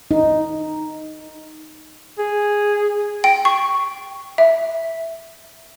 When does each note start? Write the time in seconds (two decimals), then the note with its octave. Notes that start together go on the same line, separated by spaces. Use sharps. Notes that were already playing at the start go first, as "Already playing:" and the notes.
0.11 D#4
2.19 G#4
3.24 G5
3.45 C#6
4.38 E5